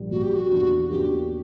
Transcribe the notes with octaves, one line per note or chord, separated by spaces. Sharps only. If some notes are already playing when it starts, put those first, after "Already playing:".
Already playing: A#1 A#2 G3
A#1 A#2 G3 F#4
G4
F#4
E2 C#3 F#3 A#3 D4
E2 C#3 F#3 A#3 D4 G4